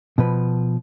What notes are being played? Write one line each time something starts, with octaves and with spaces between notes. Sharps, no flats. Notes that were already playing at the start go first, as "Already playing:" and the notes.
B2 F3 B4